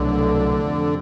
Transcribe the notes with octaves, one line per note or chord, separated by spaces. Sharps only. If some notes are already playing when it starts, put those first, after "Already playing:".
Already playing: C2 B2 D3 F#3 A3
F2 C3 F3